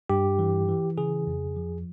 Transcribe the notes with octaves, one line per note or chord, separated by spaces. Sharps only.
G2 G4
E3
E3
C#3 G#4
F2
F3